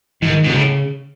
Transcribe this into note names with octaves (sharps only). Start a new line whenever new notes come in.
G#2 E3
D#3
G#2 B2
A#2
A2 C#3